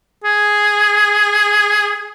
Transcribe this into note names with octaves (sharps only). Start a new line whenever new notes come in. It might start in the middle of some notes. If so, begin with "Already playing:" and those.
G#4